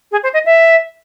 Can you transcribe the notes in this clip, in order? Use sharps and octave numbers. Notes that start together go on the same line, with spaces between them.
G#4
C5
D#5
E5